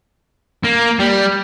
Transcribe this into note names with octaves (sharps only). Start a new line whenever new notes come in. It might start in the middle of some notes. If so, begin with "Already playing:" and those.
A#3
G3